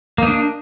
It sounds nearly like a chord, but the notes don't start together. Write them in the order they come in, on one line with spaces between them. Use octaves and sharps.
A#3 D#4 D4